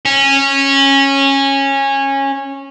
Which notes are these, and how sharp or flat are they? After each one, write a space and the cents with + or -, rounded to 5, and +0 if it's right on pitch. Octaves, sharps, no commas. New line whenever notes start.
C#4 -15